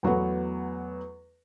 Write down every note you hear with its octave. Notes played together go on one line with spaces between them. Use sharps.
E2 F#3 A3 B3